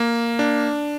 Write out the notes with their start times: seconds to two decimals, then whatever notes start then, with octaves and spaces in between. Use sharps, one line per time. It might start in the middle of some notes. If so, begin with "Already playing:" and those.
Already playing: A#3
0.39 D4